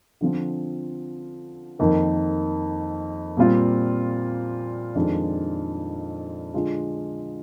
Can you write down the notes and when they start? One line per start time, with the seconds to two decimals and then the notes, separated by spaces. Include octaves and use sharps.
0.21 D3 F3 C4 F4
1.79 F2 D#3 A#3
3.37 A#2 G3 C4 F4
4.95 F2 D#3 G#3 D4 F4
6.54 D3 G#3 D4 F4